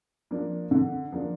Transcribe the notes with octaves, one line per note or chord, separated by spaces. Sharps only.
F3 A#3 D4
D3
F3 A#3 D4